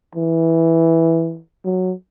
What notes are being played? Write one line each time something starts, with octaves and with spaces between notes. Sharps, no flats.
E3
F#3